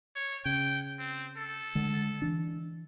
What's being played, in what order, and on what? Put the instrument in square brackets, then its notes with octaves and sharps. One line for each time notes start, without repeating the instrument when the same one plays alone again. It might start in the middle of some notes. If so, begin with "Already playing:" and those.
[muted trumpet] C#5
[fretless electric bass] C#3 [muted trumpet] G5
[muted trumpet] C4
A4
[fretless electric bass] D3 G#3
E3 D4